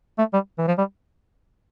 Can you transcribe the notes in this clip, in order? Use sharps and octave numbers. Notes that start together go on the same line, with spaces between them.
A3
G3
E3
F3
G3